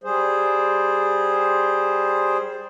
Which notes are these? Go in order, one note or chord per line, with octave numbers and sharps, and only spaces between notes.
G3 G#4 C5